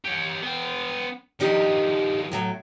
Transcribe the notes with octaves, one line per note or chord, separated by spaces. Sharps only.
G4 C#5
B3 G5
D#3 F3 D4 D#4 G4
A2 F#3 A3